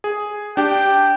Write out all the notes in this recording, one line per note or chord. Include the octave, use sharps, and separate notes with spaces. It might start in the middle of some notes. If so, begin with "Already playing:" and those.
G#4
D4 G4 G5